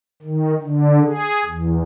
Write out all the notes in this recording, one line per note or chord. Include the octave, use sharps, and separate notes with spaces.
D#3
D3
G#4
E2